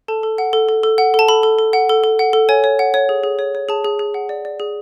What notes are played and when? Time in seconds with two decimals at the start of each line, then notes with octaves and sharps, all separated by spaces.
0.08 A4 A5
0.23 A4
0.38 F#5
0.53 A4
0.69 A4
0.83 A4
0.98 F#5
1.14 A4 A5
1.28 A4 B5
1.43 A4
1.59 A4
1.73 F#5
1.89 A4
2.04 A4
2.19 F#5
2.33 A4
2.49 C#5 G#5
2.64 C#5
2.79 F#5
2.94 C#5
3.09 G#4
3.23 G#4
3.39 C#5
3.55 C#5
3.69 G#4 A5
3.85 G#4
3.99 G#4
4.14 F#5
4.29 D5
4.45 D5
4.60 G#4